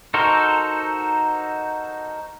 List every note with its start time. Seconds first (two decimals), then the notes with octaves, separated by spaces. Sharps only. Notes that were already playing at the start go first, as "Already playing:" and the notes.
0.14 D#4 F#4 A4 A#4 C5